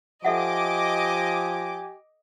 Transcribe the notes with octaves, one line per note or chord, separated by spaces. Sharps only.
F3 G4 A4 D#5 E5 F#5 G#5 D6